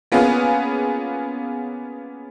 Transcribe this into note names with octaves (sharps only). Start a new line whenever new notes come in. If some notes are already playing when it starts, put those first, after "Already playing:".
A#3 B3 C#4 F4 G#4 B4